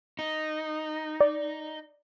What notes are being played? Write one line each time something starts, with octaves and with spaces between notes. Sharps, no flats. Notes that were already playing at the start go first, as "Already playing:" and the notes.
D#4
D5